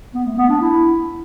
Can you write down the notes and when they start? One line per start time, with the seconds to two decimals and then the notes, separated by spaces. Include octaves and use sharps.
0.14 B3
0.26 A3
0.38 B3
0.49 D4
0.61 E4